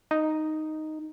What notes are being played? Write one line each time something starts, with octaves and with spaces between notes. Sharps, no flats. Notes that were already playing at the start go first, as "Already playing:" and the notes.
D#4